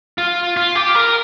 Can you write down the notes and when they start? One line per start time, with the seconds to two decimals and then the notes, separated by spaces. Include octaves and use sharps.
0.18 F4
0.57 F4
0.75 G4
0.95 A#4